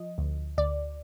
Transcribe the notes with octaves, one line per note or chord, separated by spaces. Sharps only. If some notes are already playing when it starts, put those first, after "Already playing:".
Already playing: F3 D#5
D2
D2 D5